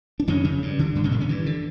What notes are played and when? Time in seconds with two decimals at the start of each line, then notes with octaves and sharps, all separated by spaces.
0.20 D4
0.28 F2 C#3 C#4
0.44 C#3
0.62 G2
0.79 D3
0.95 G2
1.04 C#3 C#4
1.11 A#2 D3 A#3
1.20 C#3 C#4
1.29 G2 E3
1.46 D3